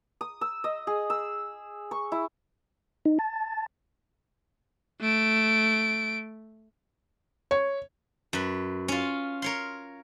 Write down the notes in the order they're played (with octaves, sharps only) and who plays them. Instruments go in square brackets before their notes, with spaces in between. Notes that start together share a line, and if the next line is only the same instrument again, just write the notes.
[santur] D#6
E6
D#5
G#4
E6
C#6
E4
[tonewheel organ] D#4
A5
[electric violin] A3 D7
[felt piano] C#5
[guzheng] F#2 B4
C#4 F4
A#4 C#5 C6